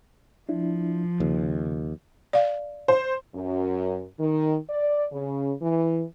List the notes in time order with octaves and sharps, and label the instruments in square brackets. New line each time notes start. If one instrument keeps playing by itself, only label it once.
[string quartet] F3 [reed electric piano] D4 E4
[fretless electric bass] D#2 [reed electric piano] C#3
[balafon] D5 F5
[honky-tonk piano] C5
[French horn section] F#2
D#3
D5
C#3
E3